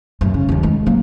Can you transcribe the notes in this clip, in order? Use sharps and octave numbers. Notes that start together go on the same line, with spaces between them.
F#2 A#2
C#3
D#1 D#2
D#3 G#3
F#3 A#3